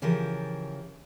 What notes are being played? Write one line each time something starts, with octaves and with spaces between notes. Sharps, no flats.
C#3 E3 F3 F4 G4 A#4